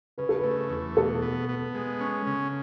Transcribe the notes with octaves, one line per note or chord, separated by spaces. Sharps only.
C#3 B4
A4
A3 B4
E2
B2 A4
B3
B3
G#3
C#4
C#3